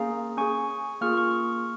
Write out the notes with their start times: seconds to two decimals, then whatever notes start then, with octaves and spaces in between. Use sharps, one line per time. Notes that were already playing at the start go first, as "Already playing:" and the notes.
Already playing: A#3 C#4 G#4 F5 A#5
0.37 C#4 G#4 G#5 C#6
1.01 A#3 F4 G#4 C#6 F6
1.17 C#6 F6